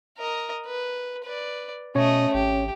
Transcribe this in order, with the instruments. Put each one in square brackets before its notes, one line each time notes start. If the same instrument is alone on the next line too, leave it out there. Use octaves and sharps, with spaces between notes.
[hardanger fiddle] A#4 D#5
B4
B4 D5
[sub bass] B2 [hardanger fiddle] A3 D#5 [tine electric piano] C#4 C#5
[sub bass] G#1 [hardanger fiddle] G4